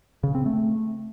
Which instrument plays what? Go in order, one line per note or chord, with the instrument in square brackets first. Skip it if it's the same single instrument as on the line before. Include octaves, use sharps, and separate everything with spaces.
[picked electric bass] C#3
C4
A3